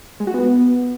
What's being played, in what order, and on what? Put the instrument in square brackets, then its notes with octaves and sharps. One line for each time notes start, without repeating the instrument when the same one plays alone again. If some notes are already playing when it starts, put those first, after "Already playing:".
[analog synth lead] G#3
F#4
B3